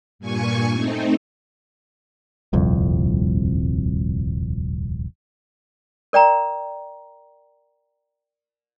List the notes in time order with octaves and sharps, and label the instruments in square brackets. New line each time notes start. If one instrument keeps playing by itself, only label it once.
[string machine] G2 A#2 G#5 C#6
A3 C4 D#4
[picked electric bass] D#1 C2 F2
[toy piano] A#4 D5 G5 A#5